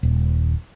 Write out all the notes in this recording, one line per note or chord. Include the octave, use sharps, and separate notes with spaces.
D#1